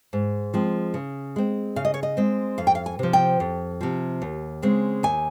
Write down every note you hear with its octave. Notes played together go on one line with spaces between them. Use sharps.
G#2
F3 G#3 C4
C#3
G#3 C4
C#3 F5
D#5
C#5
D#5
G#3 C4
F2 F5
G5
F5
G#5
C3 F3
G5
F2
C3 F3
D#2
C#3 G#3 C4
D#2 G#5